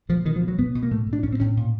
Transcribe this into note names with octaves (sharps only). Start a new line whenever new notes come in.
A#2 F3
B2 D#3
F3
B2
F#3
B2 B3
B2
A#3
A2 A3
A2
D4
A2 C#4
C4
A2 C#4
A#2